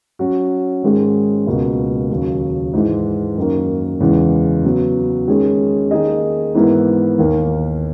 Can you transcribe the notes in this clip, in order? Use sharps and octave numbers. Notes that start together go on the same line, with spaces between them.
F#3 C#4 F#4
G#2 D#3 G#3 C#4 G#4
C#2 B2 A#3
D#2 C#3 F#3
G#2 E3 G#3
F#2 D#3 F#3 A#3
E2 C#3 E3 G#3
C#3 F#3 B3
D#3 G#3 C#4 G#4
D#3 A#3 D#4 G#4 D#5
G#2 E3 B3 E4 A#4
D#2 D#3 A#3